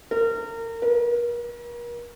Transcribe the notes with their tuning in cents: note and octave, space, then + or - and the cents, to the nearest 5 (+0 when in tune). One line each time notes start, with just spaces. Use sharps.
A#4 -30
A#4 +40